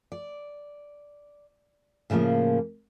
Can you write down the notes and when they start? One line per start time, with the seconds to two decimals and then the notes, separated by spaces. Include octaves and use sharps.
0.12 D5
2.10 A2 C#3 F3 G#3 A#3